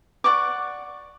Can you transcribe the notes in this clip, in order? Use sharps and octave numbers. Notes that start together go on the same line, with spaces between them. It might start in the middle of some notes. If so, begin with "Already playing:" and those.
D5 F#5 C#6 D6